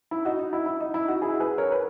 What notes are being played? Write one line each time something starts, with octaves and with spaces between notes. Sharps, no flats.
E4
D#4 F#4
D#4
E4
E4
D#4
E4
D#4 F#4
E4 G#4
G#4 B4
A#4 C#5
B4